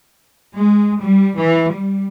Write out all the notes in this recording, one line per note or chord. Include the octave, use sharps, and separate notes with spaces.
G#3
G3
E3
G3